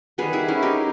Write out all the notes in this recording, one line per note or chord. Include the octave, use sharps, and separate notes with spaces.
D#3 G3 B3 G#4 B4
E4 G#4
C#4 E4
D#4 G4